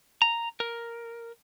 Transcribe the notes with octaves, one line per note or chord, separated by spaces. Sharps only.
A#5
A#4